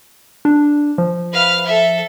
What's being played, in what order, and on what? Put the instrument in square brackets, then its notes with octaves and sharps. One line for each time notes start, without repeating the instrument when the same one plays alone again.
[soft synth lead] D4
F3
[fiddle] B4 F5
A4 E5